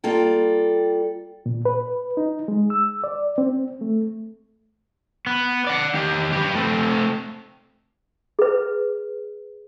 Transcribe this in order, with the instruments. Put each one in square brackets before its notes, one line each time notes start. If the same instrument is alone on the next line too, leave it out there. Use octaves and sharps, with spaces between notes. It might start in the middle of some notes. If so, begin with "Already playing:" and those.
[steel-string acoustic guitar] G3 A#3 F4 A4 G5
[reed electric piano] A#2
B4
D#4
G#3
E6
D5
C4
A3
[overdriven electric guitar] B3
D5 F#5
D#3 G4
G4 B4
A3 C4
[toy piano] G#4 B4